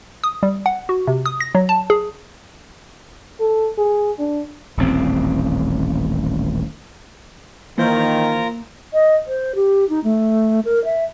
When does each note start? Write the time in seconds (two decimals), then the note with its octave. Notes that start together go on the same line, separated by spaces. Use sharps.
0.24 D#6
0.43 G3
0.66 F#5
0.89 F#4
1.07 C3
1.26 D#6
1.40 A#6
1.55 F#3
1.69 A5
1.90 G#4
3.40 A4
3.78 G#4
4.19 D4
4.77 D#1 A1 C4
7.78 D#3 E3 A#3 F4 A#4 C5 A#5 G6
8.93 D#5
9.27 C5
9.55 G4
9.89 D#4
10.04 A3
10.65 A#4
10.85 E5